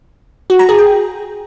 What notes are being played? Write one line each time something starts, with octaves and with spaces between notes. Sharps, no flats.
F#4
A#5
G#4
G5